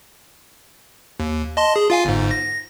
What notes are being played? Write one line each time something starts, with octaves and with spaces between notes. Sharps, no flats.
D#2
D#5 A5 C6
G#4
F4 F5 G#5
G1 G#2
A#6